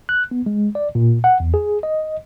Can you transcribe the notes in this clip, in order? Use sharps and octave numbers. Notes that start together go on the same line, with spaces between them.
F#6
B3
G#3
D5
A#2
F#5
E2
G#4
D#5